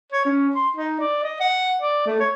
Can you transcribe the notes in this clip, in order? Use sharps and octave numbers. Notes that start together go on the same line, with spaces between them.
C#5
C#4
C6
D#4
D5
D#5
F#5
D5
A3
C#5